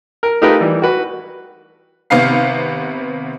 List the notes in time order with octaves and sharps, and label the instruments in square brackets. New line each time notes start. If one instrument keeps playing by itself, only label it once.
[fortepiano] A#4
A3 D#4 F4 G4 A#4 B4
E3 G3
F#4 B4
[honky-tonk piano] G#1 C3 B3 B4 F5 C7